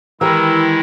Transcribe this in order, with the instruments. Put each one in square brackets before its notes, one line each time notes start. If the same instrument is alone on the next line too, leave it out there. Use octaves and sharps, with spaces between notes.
[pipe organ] D#3 G#3 E4 [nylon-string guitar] E3 [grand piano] G4 A#4 [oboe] E6